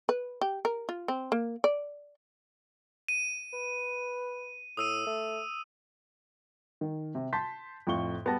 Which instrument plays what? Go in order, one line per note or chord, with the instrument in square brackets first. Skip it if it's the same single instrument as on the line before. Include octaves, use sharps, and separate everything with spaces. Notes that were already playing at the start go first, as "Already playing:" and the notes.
[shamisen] B4
G4
A#4
F4
C4
A#3
D5
[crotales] D#7
[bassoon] B4
[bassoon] A2 [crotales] D#6 E6 D#7
[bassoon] A3
[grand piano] D#3
C3
A5 C6 G6 B6
F2 A2 F4 C#6 G7
G3 B3 G#4 G5 A5 A#6